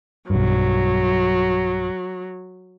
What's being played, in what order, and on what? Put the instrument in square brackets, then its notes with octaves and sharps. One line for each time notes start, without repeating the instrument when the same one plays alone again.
[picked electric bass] B1 G2 [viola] F#3